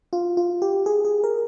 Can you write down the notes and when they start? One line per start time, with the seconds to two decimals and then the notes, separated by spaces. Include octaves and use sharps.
0.13 F4
0.37 F4
0.62 G4
0.86 G#4
1.05 G#4
1.24 A#4